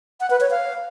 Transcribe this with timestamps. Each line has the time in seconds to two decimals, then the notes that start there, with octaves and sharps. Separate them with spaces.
0.20 F#5
0.30 B4
0.41 C#5
0.51 F5